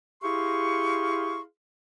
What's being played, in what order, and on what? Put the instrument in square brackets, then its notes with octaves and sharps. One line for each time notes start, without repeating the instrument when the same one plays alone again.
[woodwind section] E4 G4 G#4 F5 C6 C#6